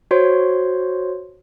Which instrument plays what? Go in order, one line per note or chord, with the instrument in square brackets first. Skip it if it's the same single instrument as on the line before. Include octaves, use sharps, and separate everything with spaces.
[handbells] F#4 C5 C#5 C6